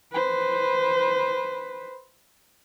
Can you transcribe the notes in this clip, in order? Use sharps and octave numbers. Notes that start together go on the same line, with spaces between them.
B4 C5